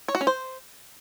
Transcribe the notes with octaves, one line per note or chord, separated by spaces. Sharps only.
C#5
F#4
C#4
C5